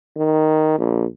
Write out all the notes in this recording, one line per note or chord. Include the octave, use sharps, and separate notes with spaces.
D#3
A#1